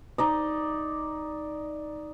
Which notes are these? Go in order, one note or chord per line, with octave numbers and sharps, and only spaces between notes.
D#4 D5 D#5